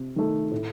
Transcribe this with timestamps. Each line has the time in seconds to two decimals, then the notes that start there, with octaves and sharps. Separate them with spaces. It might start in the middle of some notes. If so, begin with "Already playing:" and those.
Already playing: C3
0.16 D#3 A3
0.51 A2